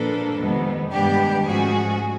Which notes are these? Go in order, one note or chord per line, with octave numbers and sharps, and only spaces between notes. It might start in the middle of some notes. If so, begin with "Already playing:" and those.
Already playing: A#2 F3 A#3 D4 A4 B4
F2 C3 D#3 G#3 B3
G2 D#3 G#3 B3 D4 G4
G#2 F3 A3 C#4 F#4 G#4